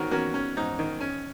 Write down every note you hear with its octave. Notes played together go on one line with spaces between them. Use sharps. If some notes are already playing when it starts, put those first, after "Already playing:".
Already playing: G#2 D#3 F#4 A#4 C#5
A#3 C#4 F#4
C#4
G#2 D#4
D#3
C#4